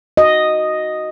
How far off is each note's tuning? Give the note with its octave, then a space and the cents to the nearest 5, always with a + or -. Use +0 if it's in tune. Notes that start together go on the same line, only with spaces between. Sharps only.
F#4 +0 D#5 +0